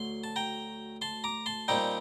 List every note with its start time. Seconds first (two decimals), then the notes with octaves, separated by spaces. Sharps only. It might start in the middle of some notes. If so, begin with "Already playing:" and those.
Already playing: D2 F#3 C6
0.24 A5
0.36 G5 A#5
1.02 A5 C6
1.24 A#5 D6
1.46 A5 C6
1.68 A#2 G3 C4 D#4 G5 A#5